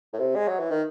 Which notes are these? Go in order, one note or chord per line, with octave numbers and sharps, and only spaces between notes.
A2
C3
G#3
F#3
E3
D#3